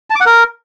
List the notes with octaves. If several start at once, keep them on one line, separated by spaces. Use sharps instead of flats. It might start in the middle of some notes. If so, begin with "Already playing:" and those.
A5
D6
F#5
A#4